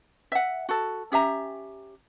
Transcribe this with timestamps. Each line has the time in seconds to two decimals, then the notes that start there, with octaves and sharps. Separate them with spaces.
0.32 E5 F#5
0.69 F#4 A4
1.12 C#4 G4 E5 A#5